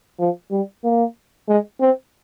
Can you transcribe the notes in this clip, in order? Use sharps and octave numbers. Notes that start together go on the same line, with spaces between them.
F3
G3
A#3
G#3
C4